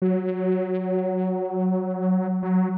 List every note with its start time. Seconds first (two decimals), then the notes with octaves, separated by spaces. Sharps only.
0.02 F#3
2.42 F#3